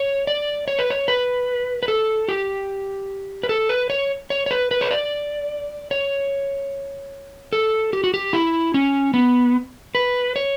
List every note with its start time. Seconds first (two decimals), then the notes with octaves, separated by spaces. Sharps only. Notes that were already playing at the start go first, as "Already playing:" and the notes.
Already playing: C#5
0.27 D5
0.68 C#5
0.79 B4
0.90 C#5
1.08 B4
1.83 B4
1.88 A4
2.28 G4
3.43 B4
3.49 A4
3.69 B4
3.90 C#5
4.30 C#5
4.46 C#5
4.51 B4
4.71 B4
4.81 C#5
4.91 D5
5.91 C#5
7.53 A4
7.93 G4
8.04 F#4
8.14 G4
8.33 E4
8.74 C#4
9.14 B3
9.95 B4
10.36 C#5